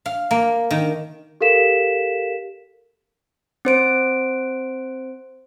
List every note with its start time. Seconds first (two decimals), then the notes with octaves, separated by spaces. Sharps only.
0.06 F5
0.31 A#3
0.71 D#3
1.41 G4 A4 A#4 F5 B6 E7
3.65 C4 C5 D7